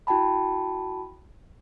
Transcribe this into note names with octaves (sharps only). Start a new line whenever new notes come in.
E4 F#4 G5 A5 B5